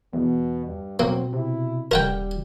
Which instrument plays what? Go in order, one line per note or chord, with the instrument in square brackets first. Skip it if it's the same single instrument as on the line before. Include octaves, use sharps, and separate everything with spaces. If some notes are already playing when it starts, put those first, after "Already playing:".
[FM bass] E2 [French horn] B2
[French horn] G2
[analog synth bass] B2 [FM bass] F#3 [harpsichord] A#3 [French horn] C4
[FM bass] C3 [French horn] E4
[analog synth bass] D#1 [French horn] G3 [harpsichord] A#4 F#5 G5